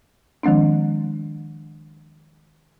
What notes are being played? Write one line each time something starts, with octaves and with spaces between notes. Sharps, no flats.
D#3 F3 G#3 C4 D4